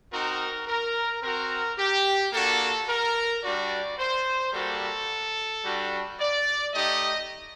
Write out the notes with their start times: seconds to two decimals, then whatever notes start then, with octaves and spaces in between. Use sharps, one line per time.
0.12 C4 D#4 F#4 A#4
0.67 A#4
1.22 C4 F#4 A#4
1.78 G4
2.33 A#3 D4 F#4 A4
2.88 A#4
3.43 G3 D4 F#4 D5
3.98 C5
4.53 G3 A#3 F#4 A4
5.63 G3 D4 F#4
6.19 D5
6.74 A3 D#4 G4 D#5